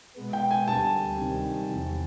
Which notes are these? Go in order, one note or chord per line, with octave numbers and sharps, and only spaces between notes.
B2 G#3 B3
G5
G#5
D2 D3 G3 A5
C3 D#3 G3
E2 C3 E3